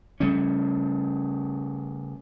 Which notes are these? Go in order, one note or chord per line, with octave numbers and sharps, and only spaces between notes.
C#3 G3 A3 C#4